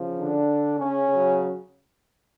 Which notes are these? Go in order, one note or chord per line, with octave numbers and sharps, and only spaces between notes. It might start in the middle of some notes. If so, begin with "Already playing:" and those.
Already playing: C#3 F3
D3 D4
C#3 C#4
C#3 F#3